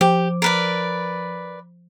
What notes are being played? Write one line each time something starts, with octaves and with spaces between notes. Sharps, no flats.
F3 G4
A#4 B4 D5